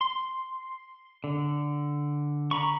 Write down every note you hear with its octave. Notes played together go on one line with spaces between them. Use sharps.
C6
D3
A#5 B5 C#6